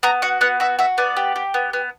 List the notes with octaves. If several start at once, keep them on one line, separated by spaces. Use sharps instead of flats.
B3 A#5
F#4 F#5
B3 F#5
F#4 E5
F#4 E5
B3 D5
G4
G4
B3
B3